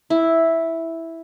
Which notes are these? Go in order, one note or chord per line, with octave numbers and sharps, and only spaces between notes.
E4